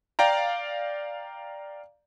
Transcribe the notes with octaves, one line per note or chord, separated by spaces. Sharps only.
D5 F5 G5 A#5